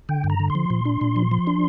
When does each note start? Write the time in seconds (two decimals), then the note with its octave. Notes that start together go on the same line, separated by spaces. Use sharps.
0.09 D3 G5
0.24 G2
0.30 A#5
0.40 D3
0.50 C6
0.55 F3
0.70 A#2
0.85 D4
1.01 A#2
1.16 F3
1.31 F3
1.47 D4